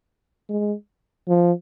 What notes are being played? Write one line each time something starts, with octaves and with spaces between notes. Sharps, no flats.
G#3
F3